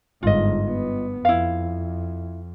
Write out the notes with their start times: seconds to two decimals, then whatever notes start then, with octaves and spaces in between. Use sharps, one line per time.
0.23 G1 G#2 F4 D#5
0.62 G2 B3
1.25 F2 E4 F5